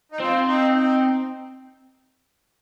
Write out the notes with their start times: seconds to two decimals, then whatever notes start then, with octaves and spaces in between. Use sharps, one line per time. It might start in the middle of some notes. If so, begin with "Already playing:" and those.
0.12 D#4
0.20 C4 F4
0.47 D#4
0.75 D#4